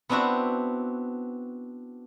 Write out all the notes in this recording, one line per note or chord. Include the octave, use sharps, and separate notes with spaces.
B3 C4 D4 E4 F#4